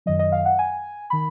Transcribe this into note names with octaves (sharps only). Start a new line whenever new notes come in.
F#2 D#3 F#3 D#5
D#5
F5
F#5
G#5
D#3 B5